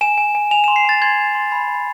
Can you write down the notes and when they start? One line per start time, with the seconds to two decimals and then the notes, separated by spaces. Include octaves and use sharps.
0.01 G#5 E7
0.18 G#5
0.35 G#5
0.51 G#5 F7
0.64 E7
0.68 C6
0.76 C7
0.85 G#5 A6
1.02 C6 G#6
1.18 C6
1.35 C6
1.52 B5
1.69 B5